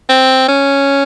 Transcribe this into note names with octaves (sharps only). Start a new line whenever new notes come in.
C4
C#4